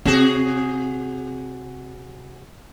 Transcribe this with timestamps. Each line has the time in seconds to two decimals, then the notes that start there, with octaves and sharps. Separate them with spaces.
0.05 C3 C4 F#4 G#4